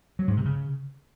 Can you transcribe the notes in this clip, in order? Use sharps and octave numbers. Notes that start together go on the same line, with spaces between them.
F#3
G#2
C3
C#3